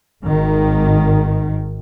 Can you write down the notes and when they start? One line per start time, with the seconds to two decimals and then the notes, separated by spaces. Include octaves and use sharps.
0.25 G#1 D#3